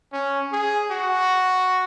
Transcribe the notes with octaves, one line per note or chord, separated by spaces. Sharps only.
C#4
G#4
F#4